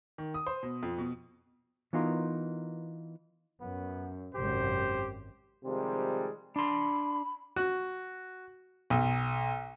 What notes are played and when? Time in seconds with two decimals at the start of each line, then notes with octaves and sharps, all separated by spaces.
0.18 D#3
0.34 D#6
0.47 C5
0.63 B2
0.83 F2
0.98 B2
1.93 E3 B3 D#4 F4 F#4 A#4
3.61 F#2 B3
4.35 G#1 F#2 C3 G4 C5
5.65 C3 D#3 F3 G3 G#3
6.56 D4 B5 C6
7.56 F#4
8.90 B1